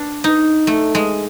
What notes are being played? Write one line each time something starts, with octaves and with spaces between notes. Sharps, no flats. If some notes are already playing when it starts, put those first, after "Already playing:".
Already playing: D4
D#4
A3
G#3